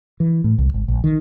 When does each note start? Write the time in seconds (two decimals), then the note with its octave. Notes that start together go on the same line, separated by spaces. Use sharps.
0.20 E3
0.44 A2
0.58 C2
0.74 G#1
0.88 A#1
1.04 D#3